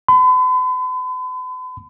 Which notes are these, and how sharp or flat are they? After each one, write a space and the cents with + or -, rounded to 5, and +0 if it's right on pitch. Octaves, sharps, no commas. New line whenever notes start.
B5 +45